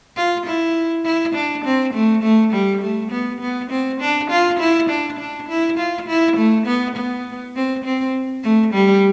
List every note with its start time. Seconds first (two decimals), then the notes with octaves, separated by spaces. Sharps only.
0.16 F4
0.46 E4
1.05 E4
1.34 D4
1.65 C4
1.94 A3
2.23 A3
2.53 G3
2.82 A3
3.11 B3
3.41 B3
3.70 C4
4.00 D4
4.30 F4
4.59 E4
4.89 D4
5.19 D4
5.49 E4
5.78 F4
6.08 E4
6.37 A3
6.67 B3
6.96 B3
7.55 C4
7.84 C4
8.43 A3
8.73 G3